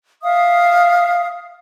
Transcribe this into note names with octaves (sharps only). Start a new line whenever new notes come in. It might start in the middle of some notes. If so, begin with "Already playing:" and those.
E5 F5 D#6